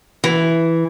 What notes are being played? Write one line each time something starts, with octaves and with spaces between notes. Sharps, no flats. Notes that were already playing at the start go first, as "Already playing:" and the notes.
E3